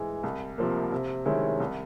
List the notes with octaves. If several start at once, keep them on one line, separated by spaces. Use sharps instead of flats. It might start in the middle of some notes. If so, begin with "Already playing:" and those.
Already playing: G#2 E3 G#3
C2
C3 F3 A#3
C3
D#3 G#3 C#4 E4
C2